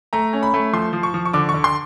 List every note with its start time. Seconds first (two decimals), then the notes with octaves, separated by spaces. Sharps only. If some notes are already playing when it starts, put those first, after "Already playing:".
0.13 A3 A#5
0.33 C#4
0.43 B5
0.54 A3
0.73 F3 C6
0.93 F3
1.03 C#6
1.14 F3
1.25 C#6
1.33 D3 D6
1.49 C#6
1.54 D3
1.64 C6